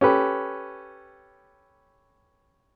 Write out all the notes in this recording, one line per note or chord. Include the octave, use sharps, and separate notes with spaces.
C#4 G4 A4 B4